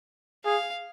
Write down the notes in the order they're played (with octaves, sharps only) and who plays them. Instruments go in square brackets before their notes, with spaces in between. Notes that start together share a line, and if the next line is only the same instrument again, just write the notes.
[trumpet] G#4 [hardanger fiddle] F5